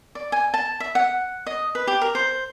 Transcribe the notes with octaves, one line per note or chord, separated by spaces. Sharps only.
D5
G#5
A5
E5
F#5
D#5
B4
G4
A#4
C5